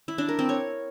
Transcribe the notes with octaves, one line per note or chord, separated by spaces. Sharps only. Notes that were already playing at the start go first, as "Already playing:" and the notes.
E4
D4
A#4
C4
C#5